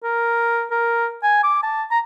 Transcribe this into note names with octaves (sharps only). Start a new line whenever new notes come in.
A#4
A#4
G#5
D6
A5
A#5